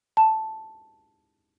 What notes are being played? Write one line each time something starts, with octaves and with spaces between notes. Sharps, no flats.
A5